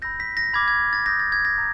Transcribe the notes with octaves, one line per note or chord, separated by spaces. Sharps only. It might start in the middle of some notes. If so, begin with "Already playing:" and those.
B5 E6 G6 A#6
B6
A#6
B5 D6 F6 G#6
G#6
A6
B5 D#6 G6 A#6
A6
G#6
A#6
A#5